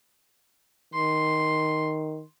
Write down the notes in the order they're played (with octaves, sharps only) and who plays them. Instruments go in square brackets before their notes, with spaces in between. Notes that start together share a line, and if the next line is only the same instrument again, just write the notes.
[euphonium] D#3 [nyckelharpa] C6